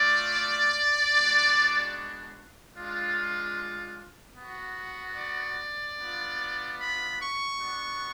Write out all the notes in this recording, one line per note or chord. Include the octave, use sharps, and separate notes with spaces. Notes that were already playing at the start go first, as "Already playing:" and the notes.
Already playing: A3 F4 D5
G#3 B3 D4 F#4
G#3 D4 F4
B3 F#4
D5
B3 D4 F4
B5
C#6
B3 D4 F#4